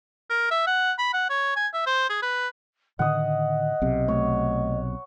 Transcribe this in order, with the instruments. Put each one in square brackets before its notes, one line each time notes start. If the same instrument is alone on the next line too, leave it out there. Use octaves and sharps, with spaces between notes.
[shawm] A#4
E5
F#5
B5
F#5
C#5
G#5
E5
C5
G#4
B4
[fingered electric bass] A2 D3 D#3 [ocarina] D#5 [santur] F#5 D#6
[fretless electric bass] B1 C3
[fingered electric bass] A3 [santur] C#5